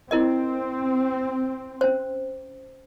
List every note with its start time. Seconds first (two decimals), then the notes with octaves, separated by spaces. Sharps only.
0.11 C4 E4 A#4 D#5
1.81 C#4 C5